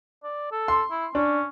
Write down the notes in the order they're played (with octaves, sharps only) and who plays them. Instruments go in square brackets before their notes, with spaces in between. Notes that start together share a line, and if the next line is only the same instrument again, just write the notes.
[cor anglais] D5
A4
[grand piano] C6
[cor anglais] E4
[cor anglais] C#4 [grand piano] D4